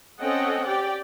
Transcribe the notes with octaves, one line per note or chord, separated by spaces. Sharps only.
C4 C#4 A4 D#5 F#5 G5
G4 D5 G5